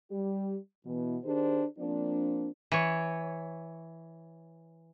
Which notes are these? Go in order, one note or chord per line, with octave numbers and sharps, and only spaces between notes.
G3 G4
B2 E3
D#3 D4 G4 G#4 C5
F3 A#3 C4 D4
E3 C#5